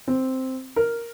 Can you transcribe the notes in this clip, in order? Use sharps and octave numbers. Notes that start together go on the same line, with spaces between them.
C4
A#4